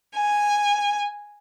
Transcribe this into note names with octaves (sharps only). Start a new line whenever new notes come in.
G#5